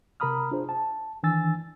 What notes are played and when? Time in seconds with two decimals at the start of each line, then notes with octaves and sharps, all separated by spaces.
0.20 C3 A#4 A#5 B5 D#6 F6
0.51 D4 F4 G#4 C5
0.69 A5
1.23 D#3 E3 D4 G#5 E6 A6